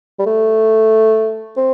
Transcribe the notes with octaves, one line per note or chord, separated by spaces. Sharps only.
G3
A3
C4